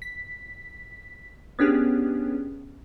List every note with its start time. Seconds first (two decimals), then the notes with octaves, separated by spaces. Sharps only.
0.02 B6
1.59 B3 C#4 D4 G4 G#4